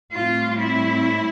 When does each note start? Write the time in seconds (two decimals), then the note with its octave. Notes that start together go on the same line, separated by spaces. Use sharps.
0.13 A2 G3 C4 F4
0.59 E4